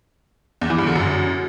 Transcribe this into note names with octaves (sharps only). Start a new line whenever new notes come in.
E2
E3
G2
D3
F#2